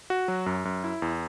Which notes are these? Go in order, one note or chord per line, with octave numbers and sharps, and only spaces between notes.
F#4
F#3
F#2
F#2
E4
E2